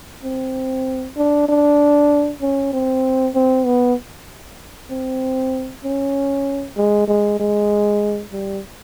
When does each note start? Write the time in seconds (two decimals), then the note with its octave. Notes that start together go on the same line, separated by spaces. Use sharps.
0.23 C4
1.17 D4
1.48 D4
2.41 C#4
2.73 C4
3.35 C4
3.66 B3
4.90 C4
5.84 C#4
6.76 G#3
7.07 G#3
7.39 G#3
8.32 G3